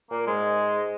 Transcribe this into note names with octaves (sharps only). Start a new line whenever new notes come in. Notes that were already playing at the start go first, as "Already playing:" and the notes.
A#2 A#3
G#2 G#3